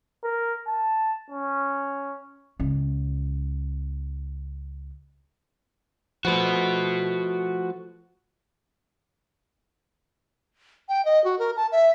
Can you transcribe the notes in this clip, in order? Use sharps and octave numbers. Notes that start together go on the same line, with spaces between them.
A#4
A5
C#4
C#2 C#4
F3 A3 F#4 B4
G5
D#5
F#4
A#4
A5
E5